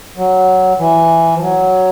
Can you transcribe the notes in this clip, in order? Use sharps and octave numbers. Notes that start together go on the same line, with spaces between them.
F#3
E3
F3
F#3